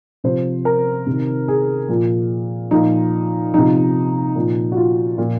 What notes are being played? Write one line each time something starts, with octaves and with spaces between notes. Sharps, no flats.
C3 F3 C5
A#4
C3 D#3
G#4
A#2 F3
A#2 F3 D#4
C3 F3 D#4
A#2 F3
F#4
F4
A#2 F3 F4